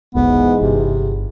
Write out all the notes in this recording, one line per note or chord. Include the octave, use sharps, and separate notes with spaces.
F1 B1 G#2 B2 E3 G#3 B3
G1 C3